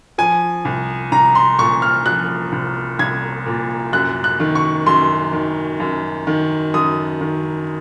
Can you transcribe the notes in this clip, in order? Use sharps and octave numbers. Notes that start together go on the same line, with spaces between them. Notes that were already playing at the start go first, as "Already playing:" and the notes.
F3 G#5
C2
C2 A#5
C6
A#2 C#6
F6
F3 F#6
C2
C2 G#6
A#2
F#2 F#6
F#6
D#3
C#6
F#2 C6
D#3
F#2
D#3
F#2 D#6
D#3